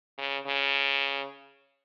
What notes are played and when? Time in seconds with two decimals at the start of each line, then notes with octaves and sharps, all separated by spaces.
0.18 C#3
0.46 C#3